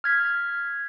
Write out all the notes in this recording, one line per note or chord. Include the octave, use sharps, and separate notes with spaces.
F6 G#6 B6